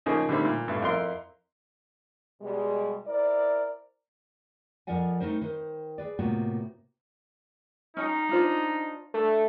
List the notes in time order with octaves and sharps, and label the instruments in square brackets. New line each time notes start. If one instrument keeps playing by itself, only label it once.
[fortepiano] C#3 F3 A#3 D#4 G#4
D3 D#3 G3 A3 C4
A#2
G2 B2 A3
F2 E4 A#4 C6
[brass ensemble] B2 G3 G#3
E4 A#4 C5 D5
[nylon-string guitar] F2 F3 A#4 D5 F#5 G#5
A3 C4 D#4 E4 A#4 C5
D#3 B4 C5
G#4 B4 D5
A2 C3 A#3 B3 F4 F#4
[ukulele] C#4 G5 A#5 [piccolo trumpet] D#4
[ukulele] D4 F4 C5
[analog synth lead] A3 [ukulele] D4